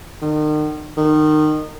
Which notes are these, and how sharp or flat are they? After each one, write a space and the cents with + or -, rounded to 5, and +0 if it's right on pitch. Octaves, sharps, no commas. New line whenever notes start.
D#3 -40
D#3 -25